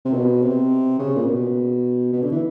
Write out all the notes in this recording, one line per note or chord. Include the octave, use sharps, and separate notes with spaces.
C3
B2
C3
C#3
A#2
B2
B2
D3
E3